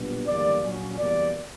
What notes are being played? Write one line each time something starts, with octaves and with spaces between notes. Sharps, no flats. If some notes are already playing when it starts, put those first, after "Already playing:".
Already playing: B1 A#2 G3 B3 D4
F#1 E2 D3 G3 A#3 D5
A#1 A#2 F#3 C#4
F#1 E2 B2 G3 A#3 D5